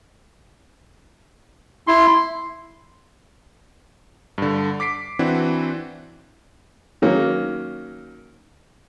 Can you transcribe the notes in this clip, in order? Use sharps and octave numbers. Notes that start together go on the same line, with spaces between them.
E4 C6
G2 D3
D6 B6 C7 D7
E3 C4 D4 E4 F#4
D#3 F#3 A#3 C#4